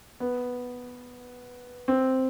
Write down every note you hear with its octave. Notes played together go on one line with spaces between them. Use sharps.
B3
C4